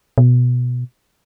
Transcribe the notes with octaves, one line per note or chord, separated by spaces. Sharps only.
B2